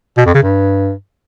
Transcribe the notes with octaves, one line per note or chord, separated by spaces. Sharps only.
B2
F2
C#3
G2